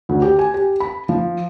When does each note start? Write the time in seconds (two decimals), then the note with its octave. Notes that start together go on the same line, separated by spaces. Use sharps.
0.09 D2
0.22 G4
0.39 G#5
0.54 G4
0.80 B5
1.09 F3